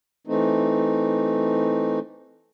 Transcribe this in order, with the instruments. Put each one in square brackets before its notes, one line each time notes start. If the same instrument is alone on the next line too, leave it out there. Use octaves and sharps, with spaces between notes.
[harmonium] E3 A3 C4 D#4